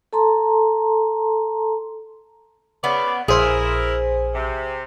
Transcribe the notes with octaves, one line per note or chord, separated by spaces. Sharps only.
A4 A5 A#5 C6
C#3 B3 D5
A#1 E4 G#4 A#4 C5
C3